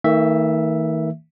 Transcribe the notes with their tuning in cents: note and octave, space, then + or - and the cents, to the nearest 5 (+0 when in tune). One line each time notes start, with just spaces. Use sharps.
D#3 +45 A#3 -45 E5 +0